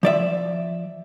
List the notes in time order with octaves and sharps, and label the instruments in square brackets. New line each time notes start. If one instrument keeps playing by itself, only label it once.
[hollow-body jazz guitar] F3 D5 E5